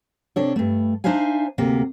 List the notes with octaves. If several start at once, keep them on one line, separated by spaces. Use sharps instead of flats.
C3 D4 A4 C#5
G2 A3
D4 D#4 C5 E5 F5 G#5
D2 C3 A#3